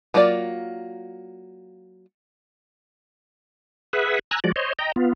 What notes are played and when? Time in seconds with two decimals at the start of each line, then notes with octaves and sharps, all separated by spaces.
0.14 F#3 A#3 F4 A4 D5
3.93 G#4 B4 E5 F#5
4.31 G#5 A#5 E6 F#6
4.44 F3 G#3 F#4 D5
4.56 C5 C#5 D#5
4.79 D#5 G5 A#5
4.96 B3 F4